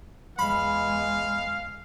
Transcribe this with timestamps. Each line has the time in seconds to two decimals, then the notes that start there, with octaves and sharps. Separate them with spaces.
0.39 E2 G#3 F5 B5